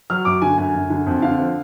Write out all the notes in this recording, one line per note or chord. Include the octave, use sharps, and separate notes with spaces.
F#3 F6
F#2 D6
D3 G#5
F#2 G#5
F#2
D3
F2
D3 F5
F3